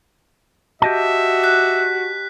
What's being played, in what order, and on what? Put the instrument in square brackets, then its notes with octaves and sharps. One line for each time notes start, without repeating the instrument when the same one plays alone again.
[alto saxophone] F#4 [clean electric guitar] G4 D#5 A5 [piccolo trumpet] E5
[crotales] F#6 B6